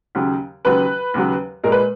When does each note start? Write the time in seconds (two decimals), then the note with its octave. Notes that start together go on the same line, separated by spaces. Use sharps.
0.15 D#2 C#3 F#3
0.65 D#2 C#3 F#3 B4
1.14 D#2 C#3 F#3
1.64 A#2 G#3 A#4
1.72 B4